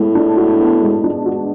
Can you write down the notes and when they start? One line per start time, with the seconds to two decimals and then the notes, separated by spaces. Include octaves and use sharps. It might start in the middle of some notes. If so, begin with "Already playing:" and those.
Already playing: A2 G#3 B3
0.15 D4
0.37 F#4
0.60 B3
0.82 G#3
1.04 D4
1.26 F#4